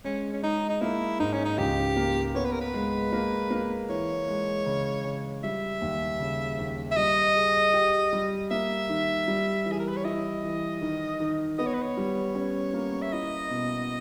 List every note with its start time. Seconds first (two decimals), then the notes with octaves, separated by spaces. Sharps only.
0.04 G#3 C#4
0.33 C#4
0.43 G#3 D#4
0.70 D#4
0.81 A#3 E4
1.19 G#2 D#4
1.33 C#4
1.45 D#4
1.58 C#2 G4
1.96 A#3
2.35 B3 C#5
2.44 B4
2.52 A#4
2.61 B4
2.74 G#3
3.12 A#3
3.50 A#3
3.89 E3 C#5
4.28 G#3
4.66 C#3
5.05 C#3
5.44 G3 E5
5.81 D#2
6.20 C#3
6.59 D#2
6.91 E5
6.97 G3 D#5
7.36 G#4
7.74 G4
8.13 G3
8.51 A#3 E5
8.89 D#3
9.28 G3
9.66 E3
9.72 G#4
9.79 A#4
9.88 B4
9.96 C#5
10.04 E4 D#5
10.44 E3
10.81 D#3
11.20 D#3
11.58 B3 D#5
11.66 C#5
11.74 B4
11.82 C#5
11.97 G3
12.35 C#4
12.74 A#3
13.02 E5
13.13 E4 D#5
13.50 B2